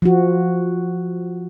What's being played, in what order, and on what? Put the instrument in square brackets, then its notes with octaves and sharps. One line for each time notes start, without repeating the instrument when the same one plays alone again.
[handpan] F3 F#4